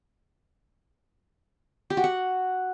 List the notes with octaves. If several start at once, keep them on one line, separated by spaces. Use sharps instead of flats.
G4
F#4
F#5